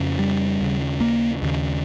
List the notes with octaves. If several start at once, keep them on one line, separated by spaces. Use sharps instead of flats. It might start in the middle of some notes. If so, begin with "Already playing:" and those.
Already playing: F2 C#3
G3
D#2 C#3
A#3
D#2 C#3